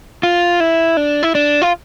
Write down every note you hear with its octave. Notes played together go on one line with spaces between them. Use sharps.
F4
E4
D4
E4
D4
F4